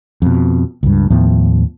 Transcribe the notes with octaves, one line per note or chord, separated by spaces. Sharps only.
F2 B2
C#2 G2
D#2 A2 F3 B3